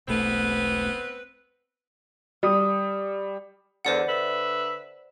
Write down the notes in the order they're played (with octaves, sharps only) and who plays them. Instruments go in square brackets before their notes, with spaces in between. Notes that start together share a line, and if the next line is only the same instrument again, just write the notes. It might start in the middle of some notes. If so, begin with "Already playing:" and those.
[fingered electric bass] E1 B1 A3 [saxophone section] B3 C4 B4
[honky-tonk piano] G3 [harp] D#6
[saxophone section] E2 D3 [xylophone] C5 D5 F#5
[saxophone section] D3 B4 E5